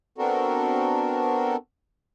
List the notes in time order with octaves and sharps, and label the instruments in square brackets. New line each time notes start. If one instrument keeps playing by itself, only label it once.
[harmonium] B3 C4 D4 F#4 A4 A#4